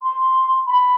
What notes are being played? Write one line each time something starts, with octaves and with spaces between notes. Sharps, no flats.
C6
B5